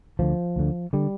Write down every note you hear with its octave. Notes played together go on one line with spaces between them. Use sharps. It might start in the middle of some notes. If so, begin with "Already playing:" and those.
D2 D3 F3
D2 D3
D3 G3